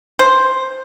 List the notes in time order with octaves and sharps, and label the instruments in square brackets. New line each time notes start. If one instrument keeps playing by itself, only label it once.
[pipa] C5